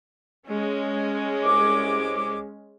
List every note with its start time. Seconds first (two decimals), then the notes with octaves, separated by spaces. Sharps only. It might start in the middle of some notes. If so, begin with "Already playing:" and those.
0.47 G#3 C#4
1.44 C2 D6